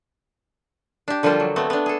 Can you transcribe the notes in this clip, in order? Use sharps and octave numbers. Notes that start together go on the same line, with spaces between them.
D4 G4
D3 F3 G3 A#3 F4 C5
F#3
A3 B3 C4
B3 D4
G#4 A4